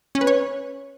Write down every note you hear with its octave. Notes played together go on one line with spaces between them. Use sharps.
C#4
B4
C#5